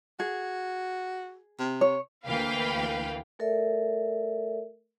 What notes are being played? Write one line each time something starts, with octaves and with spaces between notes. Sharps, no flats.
F#4 G#4
C3
C#5
D2 E3 A#3 B4 F5 G5
A3 A4 A#4 D5 E5